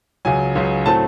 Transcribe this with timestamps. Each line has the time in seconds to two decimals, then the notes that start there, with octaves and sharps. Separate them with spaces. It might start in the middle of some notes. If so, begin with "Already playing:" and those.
0.25 C#2 C#3 F#3 G#5
0.55 C#2 C#3 F#3
0.85 A2 F#3 A3 C4 A5